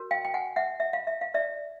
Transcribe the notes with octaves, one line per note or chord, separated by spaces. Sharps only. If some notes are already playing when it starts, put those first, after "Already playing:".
Already playing: F#4 A#4 C#5
F5 G5
G5
F#5 G#5
E5 F#5
E5
F5
E5
F5
D5 E5